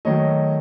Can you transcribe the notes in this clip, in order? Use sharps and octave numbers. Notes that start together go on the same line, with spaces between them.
D#3 F#3 A3 C#5 D#5